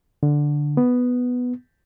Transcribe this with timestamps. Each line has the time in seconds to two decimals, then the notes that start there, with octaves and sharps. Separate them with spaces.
0.23 D3
0.77 B3